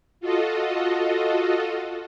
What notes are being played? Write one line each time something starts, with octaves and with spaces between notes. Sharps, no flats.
F4 F#4 A4 D#5